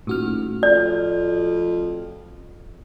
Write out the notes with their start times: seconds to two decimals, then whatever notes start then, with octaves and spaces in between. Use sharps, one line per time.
0.07 D#1 A2 F#4 F6
0.63 F2 D5